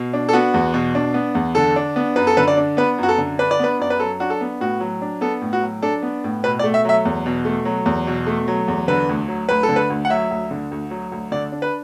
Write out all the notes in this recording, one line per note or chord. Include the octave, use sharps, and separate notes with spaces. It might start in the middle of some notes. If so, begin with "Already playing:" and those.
Already playing: B2
D4
A4
B3 F#4
E2
B2
D4
B3
E2
D3 A4
D4
B3
F#2 B4
A4
D3 B4
D5
D4
B3 B4
F#2 F#4
A4
D3
D4 B4
D5
B3 B4
F#2 D5
B4
F#3 A4
D4 F#4
A4
B3
A2 F#4
F#3
D4
B3 A4
A2
F#4
F#3
D4 A4
B3
A2
B2 B4
D5
A3
E5
F#3 E5
E2
B2
A3
F#3
E2
B2
A3
F#3
E2
D3 B4
D2
F#3
D2 B4
A4
D3
B4
D2
F#5
F#3 E5
D2
D3
D2
F#3
D2
D3 D5
D4
B4